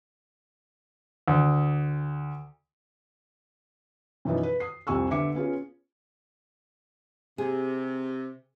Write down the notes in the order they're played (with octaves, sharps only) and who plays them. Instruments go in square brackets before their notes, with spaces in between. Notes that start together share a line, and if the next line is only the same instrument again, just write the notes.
[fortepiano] D2
[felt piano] F#2 B2 E3 F3 B3 D#4
B4
D#6 C7
C2 F2 C3 G#5 C#6 E6
D3 B3 E5 D6 C#7
B3 C#4 F4 G#4
[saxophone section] C3 [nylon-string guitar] G#4